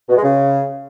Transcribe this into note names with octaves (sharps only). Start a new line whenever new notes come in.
B2
G#3
C#3